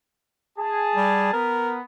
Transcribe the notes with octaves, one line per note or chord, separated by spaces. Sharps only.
G#4 A5
G3
B3 A#4